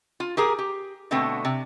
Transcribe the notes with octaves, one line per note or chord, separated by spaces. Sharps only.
F4
G4 G#4 A#4 G#5
G4
B2 D3 A3 B3 C4
C3